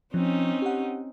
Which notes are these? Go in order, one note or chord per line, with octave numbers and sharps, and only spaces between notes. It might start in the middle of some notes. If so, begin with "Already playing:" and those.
F3 C4 C#4 D#4
G4 F#5